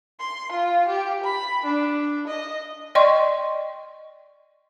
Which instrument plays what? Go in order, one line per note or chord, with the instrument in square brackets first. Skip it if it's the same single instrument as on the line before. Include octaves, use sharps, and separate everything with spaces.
[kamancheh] C6
F4
G4
B5
D4
D#5
[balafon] D5 D#5 G5 C6 C#6